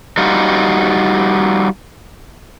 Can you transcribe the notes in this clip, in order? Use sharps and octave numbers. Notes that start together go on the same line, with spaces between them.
G3 D#4 F4 F#4